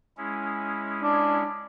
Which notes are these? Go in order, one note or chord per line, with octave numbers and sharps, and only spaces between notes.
G#3 C#4 E4
D4